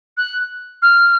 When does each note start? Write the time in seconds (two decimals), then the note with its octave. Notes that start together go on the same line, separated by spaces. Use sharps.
0.17 F#6
0.82 F6